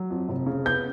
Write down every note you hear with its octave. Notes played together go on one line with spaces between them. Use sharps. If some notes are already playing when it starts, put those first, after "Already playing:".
Already playing: F#3
F2
F1
C#3
B3 G6